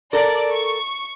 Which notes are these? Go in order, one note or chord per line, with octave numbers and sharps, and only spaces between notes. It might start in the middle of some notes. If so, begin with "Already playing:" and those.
A4 A#4 D5
C#6